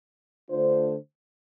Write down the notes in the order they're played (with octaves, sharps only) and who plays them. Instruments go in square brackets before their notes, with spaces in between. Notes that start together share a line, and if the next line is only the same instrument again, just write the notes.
[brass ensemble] D3 A3 D4 F4 C5